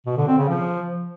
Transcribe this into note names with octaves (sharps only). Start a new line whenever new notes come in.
B2
D3
C4
C#3
F3